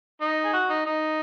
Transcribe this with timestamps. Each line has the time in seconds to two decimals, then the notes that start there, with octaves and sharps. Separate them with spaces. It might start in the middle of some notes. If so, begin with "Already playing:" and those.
0.21 D#4
0.44 G#4
0.53 F#4
0.70 D#4
0.86 D#4